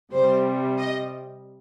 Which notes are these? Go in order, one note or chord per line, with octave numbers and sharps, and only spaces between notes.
C3 G3 C5
D#5